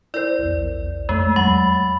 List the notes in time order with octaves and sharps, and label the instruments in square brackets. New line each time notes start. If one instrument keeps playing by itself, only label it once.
[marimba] E4 A#4 C5 [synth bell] D5
[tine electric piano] A#1 E2
[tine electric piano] F2 A3 [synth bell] G#3
[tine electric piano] E2 [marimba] F#3 [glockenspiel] B5 [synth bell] A6